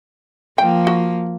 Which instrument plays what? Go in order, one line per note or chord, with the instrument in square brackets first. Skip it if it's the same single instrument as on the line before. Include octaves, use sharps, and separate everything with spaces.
[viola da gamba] F3 A#3 [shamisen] G5
[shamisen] F#4